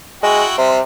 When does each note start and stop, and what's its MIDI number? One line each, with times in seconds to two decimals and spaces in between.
0.23 0.44 56
0.23 0.55 64
0.23 0.55 66
0.23 0.55 79
0.58 0.81 48
0.58 0.77 55
0.58 0.77 60
0.58 0.77 72